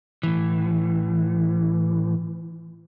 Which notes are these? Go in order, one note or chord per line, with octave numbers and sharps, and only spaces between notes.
A2 E3